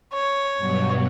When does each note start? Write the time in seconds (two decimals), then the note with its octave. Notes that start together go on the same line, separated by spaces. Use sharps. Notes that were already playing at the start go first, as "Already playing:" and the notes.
0.14 C#5
0.58 G2 B2 F#3